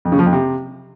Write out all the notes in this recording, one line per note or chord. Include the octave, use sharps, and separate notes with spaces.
F2
C#3
F3
F2
C3